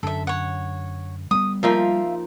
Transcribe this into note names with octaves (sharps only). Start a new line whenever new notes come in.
F#2 D3 A4 E5
C#5 F#5
G3 A3 B3 D#6
F3 A#3 D#4 F4 E5 F5